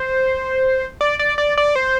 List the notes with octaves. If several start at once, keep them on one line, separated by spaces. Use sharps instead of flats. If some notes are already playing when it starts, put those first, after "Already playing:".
Already playing: C5
D5
D5
D5
D5
C5